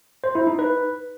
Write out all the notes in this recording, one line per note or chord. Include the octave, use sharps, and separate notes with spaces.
C5
E4
D#4
B4